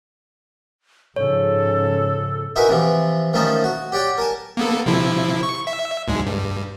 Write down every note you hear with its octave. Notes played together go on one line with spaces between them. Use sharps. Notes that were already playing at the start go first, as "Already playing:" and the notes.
G#2 C#3 F3 A4 C#5
D#4 E4 F#4 A#4 B4 G#5
C3 E3 F3
D#3 F3 A3 C#4 D#4 A5
F#4
G4 C#5 D5 F#5 G5
A#4 G#5 A5
A#3 B3 A4
C3 F3 E4
C#6
E5
D2 G#2 G#3
G2